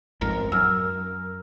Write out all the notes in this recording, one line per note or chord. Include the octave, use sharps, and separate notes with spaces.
A1 F2 G#2 A#4
F#2 E6 F6